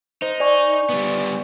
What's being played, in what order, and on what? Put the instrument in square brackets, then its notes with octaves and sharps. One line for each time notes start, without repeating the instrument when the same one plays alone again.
[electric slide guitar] D#4 [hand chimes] C5
[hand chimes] D5 G#5 C#6
[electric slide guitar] G3 B3